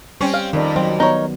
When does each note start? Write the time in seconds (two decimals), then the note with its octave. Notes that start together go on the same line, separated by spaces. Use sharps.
0.21 G3 C4 C#4
0.34 F5
0.53 F2 D#3 A#4 D5
0.76 F#3 C4
1.00 B3 D#4 A#4 C#5